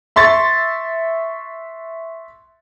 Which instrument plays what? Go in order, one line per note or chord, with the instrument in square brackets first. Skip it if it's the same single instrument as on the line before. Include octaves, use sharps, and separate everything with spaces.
[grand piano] E5 C6 C#6 A6